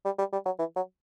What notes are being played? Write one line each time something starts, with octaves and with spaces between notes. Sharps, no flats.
G3
G3
G3
F#3
E3
F#3